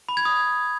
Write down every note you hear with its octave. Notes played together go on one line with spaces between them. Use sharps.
B5
G#6
D#6